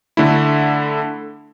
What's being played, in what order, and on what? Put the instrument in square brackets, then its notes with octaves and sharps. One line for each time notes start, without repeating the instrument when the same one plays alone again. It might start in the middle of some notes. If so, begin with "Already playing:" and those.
[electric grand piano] D3 A3 E4